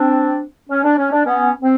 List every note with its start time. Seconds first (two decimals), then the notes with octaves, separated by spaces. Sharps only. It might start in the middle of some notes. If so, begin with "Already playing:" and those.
Already playing: C4 D4
0.70 C#4
0.84 D4
0.97 C#4
1.11 D4
1.25 B3 C#4
1.62 C4